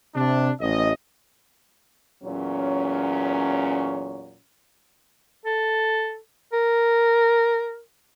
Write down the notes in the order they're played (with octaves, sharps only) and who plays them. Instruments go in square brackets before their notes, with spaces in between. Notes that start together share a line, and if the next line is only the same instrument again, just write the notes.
[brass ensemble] C3 D4
A1 D#5
[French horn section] E2 A#2 F#3 C#4
[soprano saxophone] A4
A#4